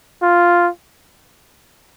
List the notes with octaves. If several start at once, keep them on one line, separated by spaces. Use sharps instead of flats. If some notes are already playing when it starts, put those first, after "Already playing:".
F4